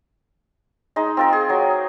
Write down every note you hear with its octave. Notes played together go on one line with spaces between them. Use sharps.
G#3 D#4
C4 F4 A#4
G#4
F#3